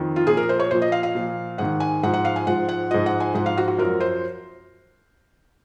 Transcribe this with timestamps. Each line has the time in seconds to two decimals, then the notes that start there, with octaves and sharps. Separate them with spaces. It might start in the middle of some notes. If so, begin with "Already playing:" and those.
Already playing: F2 D#3
0.16 F4
0.26 A#2 F3 G#4
0.37 A#4
0.49 C5
0.59 C#5
0.71 A#2 F3 C5
0.82 D#5
0.92 F5
1.03 F5
1.15 A#2 F3
1.58 G#2 D#3 F#5
1.80 G#5
2.03 G#2 F#5
2.07 F3
2.14 F#5
2.25 F5
2.36 G#5
2.47 G#2 F3 F#5
2.69 F#5
2.91 G#2 F3 D#5
3.06 F#5
3.20 G#5
3.35 G#2 F3 F#5
3.46 F5
3.58 F#4
3.68 F#4
3.78 F#2 F3 A#4
4.00 C5